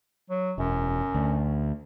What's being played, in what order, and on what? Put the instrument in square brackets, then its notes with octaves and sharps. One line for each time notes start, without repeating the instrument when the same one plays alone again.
[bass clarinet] F#3
[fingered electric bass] E1 [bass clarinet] F#2
[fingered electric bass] D2